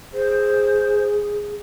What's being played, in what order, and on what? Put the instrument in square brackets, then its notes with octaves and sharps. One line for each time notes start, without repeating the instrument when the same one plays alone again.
[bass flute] G#4 [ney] C5